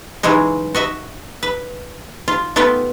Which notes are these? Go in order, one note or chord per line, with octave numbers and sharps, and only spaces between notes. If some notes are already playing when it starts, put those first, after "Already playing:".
C#3 E3 F#3 G#3 D#4
F#4 D#5 E5
B4
F4
A3 B3 F4 G4 B4